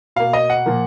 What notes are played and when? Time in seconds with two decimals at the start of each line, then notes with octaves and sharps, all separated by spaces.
0.16 B2 A#3 F5
0.33 D#5
0.50 F#5
0.66 A#2 F3 A#3